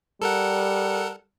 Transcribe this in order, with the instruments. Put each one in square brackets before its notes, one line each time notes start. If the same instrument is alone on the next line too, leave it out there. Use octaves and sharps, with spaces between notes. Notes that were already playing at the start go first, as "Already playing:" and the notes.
[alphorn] G3 [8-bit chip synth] A4 A#4 F#5